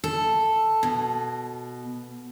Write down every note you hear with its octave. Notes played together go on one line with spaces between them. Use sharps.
A4
B2